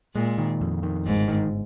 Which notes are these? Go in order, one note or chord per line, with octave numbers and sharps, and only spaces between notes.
A#2 G#3
D#3
F2
D#3
G1 G#2
D#3